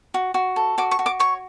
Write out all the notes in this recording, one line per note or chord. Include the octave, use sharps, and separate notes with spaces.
F#4
F#4
A4
F#4 D6
C#6
F#4
D6
C#5 C#6